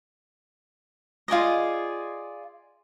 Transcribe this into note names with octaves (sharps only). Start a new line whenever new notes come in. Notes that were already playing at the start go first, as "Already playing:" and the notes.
F4 G#4 D5 D#5